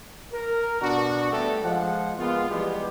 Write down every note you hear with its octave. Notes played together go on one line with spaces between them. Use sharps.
A#4
B2 D4 F#4
G3 A3 B3 D4 G4 A4
F3 G#3 F#5
G#3 A#3 B3 F4
E3 F3 G3 G#3 B3 G4